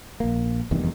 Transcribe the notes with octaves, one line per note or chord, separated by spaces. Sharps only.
A#1 A#3
F1 E2 G2 D#3